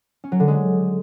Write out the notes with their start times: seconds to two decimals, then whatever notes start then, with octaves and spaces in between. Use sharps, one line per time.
0.24 C#4
0.32 F#3
0.40 D3
0.48 G#3